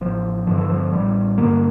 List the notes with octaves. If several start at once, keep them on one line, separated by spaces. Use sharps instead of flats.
A1 F3
G2 D3 F3
E3
F3
A1 G3
G2 D3 A#3